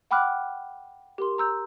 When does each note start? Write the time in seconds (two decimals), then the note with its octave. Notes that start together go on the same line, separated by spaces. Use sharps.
0.11 F#5 G5 B5 D6 F6 F#6
1.18 G4 A#4 C6
1.38 A#5 E6 G6